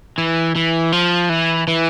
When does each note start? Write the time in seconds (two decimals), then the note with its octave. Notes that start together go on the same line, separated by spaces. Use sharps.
0.18 E3
0.55 E3
0.92 F3
1.29 E3
1.68 E3